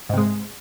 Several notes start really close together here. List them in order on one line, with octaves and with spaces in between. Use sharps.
G#2 C3 G#3